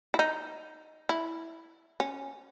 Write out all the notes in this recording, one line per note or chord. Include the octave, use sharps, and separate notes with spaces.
E4
D#4
E4
C#4